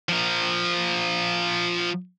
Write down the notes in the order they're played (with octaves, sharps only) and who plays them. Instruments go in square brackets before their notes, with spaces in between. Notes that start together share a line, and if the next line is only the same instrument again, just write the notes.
[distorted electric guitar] F3 A#4